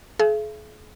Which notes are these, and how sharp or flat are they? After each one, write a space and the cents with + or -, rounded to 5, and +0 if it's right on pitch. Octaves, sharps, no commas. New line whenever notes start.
G#4 +45 E5 +45